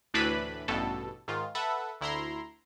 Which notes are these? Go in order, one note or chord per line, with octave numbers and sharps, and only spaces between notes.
D2 A2 E3 D4 B4 B5
A1 G2 B2 A4
G#2 D#3 F4
A4 B4 E5 F#5
D2 E4 A#5 C6